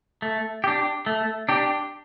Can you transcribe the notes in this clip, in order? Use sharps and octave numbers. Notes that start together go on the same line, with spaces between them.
A3
D4 G4
A3
D4 G4